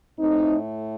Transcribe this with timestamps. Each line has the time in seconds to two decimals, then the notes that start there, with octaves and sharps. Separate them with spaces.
0.19 A2 A3 C4 D#4